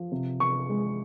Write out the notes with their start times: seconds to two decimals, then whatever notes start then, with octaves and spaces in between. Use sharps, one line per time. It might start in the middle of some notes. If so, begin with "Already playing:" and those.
Already playing: F3
0.12 C3
0.40 C3 C#6
0.69 G#3